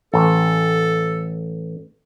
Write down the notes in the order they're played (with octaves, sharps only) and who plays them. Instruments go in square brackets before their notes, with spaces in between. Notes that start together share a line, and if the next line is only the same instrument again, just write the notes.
[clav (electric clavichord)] A1 [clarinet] A4